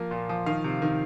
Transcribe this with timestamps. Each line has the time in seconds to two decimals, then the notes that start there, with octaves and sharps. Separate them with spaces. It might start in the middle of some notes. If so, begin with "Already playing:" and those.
Already playing: F3 A#3
0.11 A#2
0.29 F3
0.46 D#3 F5
0.64 C3
0.82 D#3